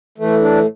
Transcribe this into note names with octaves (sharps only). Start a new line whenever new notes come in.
A2 E3 A3
D4